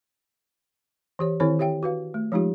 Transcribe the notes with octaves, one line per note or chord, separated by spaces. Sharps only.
E3 G4 C#5
D#3 C4 E4 A4 C5 C#5
G4 C#5 E5 G5
F#4 B4 F5
A3
F3 G#3 D#4 F4 G4